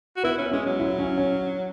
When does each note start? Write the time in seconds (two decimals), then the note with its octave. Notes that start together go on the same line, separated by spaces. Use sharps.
0.16 F#4
0.23 B3 E4
0.38 C#4
0.52 G#3 C#4
0.66 F#3
0.80 E4
0.99 C#4
1.18 C#4